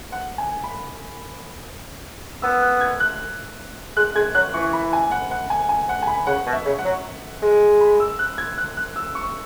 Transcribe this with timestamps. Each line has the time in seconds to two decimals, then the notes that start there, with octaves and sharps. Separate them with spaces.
0.12 F#5
0.38 G#5
0.64 B5
2.42 B3 E6
2.62 F#6
2.81 G#6
3.00 F#6
3.97 G#3 F#6
4.15 G#3 G#6
4.34 F#3 F#6
4.54 E3 C#6
4.73 B5
4.93 G#5
5.11 F#5
5.31 F#5
5.50 G#5
5.69 G#5
5.89 F#5
6.03 G#5
6.07 B5
6.27 C#3 F#5
6.46 B2
6.53 E5
6.65 C#3
6.79 F#5
6.85 F#3
7.42 G#3
7.81 B5
8.00 E6
8.19 F#6
8.38 G#6
8.58 F#6
8.77 F#6
8.96 E6
9.15 C#6